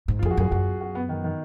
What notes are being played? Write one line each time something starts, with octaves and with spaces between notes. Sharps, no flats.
G#2
F4
F2 G#4
F#4
F#2 G#4
F#2 F#4
F#4
B3
D#3
D#3